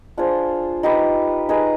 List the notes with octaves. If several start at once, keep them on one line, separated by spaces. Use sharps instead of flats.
D4 F4 G#4 C5
D#4 G4 B4
D#4 G#4 B4